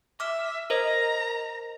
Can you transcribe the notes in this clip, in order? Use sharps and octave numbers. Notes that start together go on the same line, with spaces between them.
E5 D6 F6
A#4 C5 D#5 A#5